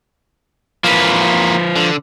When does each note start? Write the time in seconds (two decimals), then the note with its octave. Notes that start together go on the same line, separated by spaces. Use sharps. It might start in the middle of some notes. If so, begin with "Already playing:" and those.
0.84 E3 F3 A#3 B4
1.76 D3